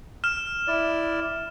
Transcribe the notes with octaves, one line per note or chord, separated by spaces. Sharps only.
F6 E7
E4 D5